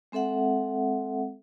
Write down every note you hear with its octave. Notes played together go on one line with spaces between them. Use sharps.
G#3 C4 A4 E5 F#5